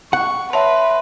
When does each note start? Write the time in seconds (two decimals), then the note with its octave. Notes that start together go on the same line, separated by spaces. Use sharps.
0.13 F#5 C#6
0.53 B4 C#5 E5 A5 C6